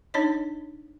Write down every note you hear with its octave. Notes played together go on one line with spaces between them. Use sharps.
D4 D#4 C#5 D#5